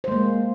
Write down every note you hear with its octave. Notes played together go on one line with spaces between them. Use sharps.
G#3 A#3 C5